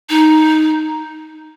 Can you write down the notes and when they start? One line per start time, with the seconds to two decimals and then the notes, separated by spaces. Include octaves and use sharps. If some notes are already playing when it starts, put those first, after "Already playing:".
0.09 D#4